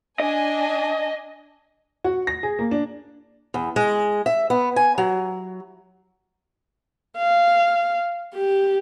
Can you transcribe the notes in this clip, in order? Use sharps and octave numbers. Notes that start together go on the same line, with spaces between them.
D4 D#5 G#5
F#4
A#6
G#4
A#3
D4
E2
G#3
E5
B3
G#5
F#3
F5
G4